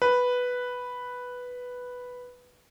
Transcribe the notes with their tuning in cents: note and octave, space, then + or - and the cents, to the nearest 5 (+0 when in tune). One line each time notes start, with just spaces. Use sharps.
B4 +0